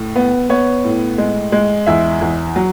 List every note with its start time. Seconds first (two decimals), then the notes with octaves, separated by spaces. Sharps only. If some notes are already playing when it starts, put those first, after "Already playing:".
Already playing: A2
0.16 B3
0.49 B3 C#5
0.84 A2
1.18 G#3
1.52 G#3
1.86 E2 E5
2.21 E2
2.56 F#3